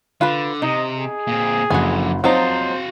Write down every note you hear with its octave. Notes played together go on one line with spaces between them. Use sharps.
D3 F4 B4 B5
C3 D#4 D#5
G#4
A#2 C4
F#1 F2 D3 F#4 G#5
F3 F#3 C4 D#4 F#4 C5 F5